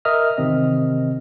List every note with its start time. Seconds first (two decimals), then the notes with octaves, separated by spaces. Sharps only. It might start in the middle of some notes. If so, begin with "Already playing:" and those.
0.05 A#4 D#5 E5 D#6 F6
0.37 A1 C3 D#3 C4 D#5